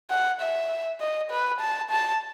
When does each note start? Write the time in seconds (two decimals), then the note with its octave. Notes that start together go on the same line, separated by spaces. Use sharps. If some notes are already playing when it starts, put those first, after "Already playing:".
0.11 F#5
0.41 E5
1.01 D#5
1.31 B4
1.61 A5
1.91 A5